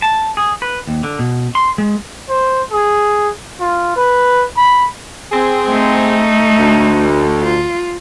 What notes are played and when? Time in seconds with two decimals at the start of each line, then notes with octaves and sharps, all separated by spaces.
0.02 A5
0.37 G#4
0.62 B4
0.87 D#2
1.03 D3
1.19 B2
1.55 C6
1.78 G#3
2.29 C5
2.72 G#4
3.60 F4
3.96 B4
4.57 B5
5.32 C4 G#4
5.69 A3 D#4
6.59 D2
7.43 F4